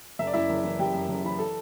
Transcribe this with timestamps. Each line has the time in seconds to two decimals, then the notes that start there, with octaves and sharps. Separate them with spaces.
0.19 F#1 E5
0.27 D5
0.33 F#2 E4 E5
0.50 F#1
0.64 E3
0.79 F#1 G4 G5
0.94 F#2
1.09 F#1
1.24 E3 B5
1.39 A4 A5